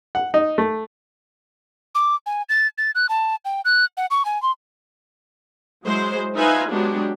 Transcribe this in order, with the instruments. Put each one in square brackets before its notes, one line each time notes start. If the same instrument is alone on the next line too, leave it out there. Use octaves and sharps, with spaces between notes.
[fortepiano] F#5
D#4
A3
[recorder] D6
G#5
A6
A6
F#6
A5
G5
F#6
F#5
C#6
G#5
C6
[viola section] F#3 G#3 E4 C5
D#4 F4 B4 E5 F5 G#5
F#3 G#3 B3 D4 F#4 G4